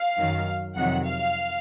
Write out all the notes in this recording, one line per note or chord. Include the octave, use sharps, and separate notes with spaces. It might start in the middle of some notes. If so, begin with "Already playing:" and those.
Already playing: F5
F#2 D#3 F#3
F2 C3 D#3 F#3 F#5
F5